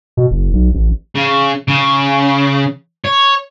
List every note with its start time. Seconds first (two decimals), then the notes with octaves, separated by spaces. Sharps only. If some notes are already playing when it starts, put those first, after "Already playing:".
0.17 B2
0.31 F#1
0.53 B1
0.74 A1
1.16 C#3
1.68 C#3
3.04 C#5